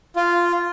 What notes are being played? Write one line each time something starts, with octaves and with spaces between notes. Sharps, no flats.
F4